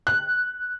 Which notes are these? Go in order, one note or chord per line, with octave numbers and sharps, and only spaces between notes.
F#6